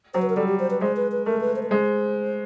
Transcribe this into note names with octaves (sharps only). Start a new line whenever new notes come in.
F#3 C5
B4
A#4
G3 A4
G4
C5
B4
G#3 C5
B4
B4
A3 A#4
B4
C5
B4
G#3 C5